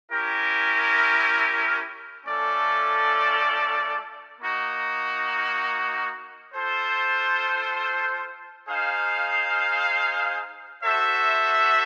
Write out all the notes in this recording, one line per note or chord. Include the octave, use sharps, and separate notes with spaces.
C#4 E4 G4 A#4
A3 C#4 F4 A4 D5
A#3 D#4 F#4
F4 A4 C5
D#4 G#4 C5 F5
F#4 A4 C5 E5